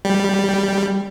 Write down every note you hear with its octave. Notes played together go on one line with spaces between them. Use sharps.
G3